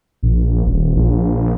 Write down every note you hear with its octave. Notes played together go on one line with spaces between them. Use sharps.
A#1
D#1
A#1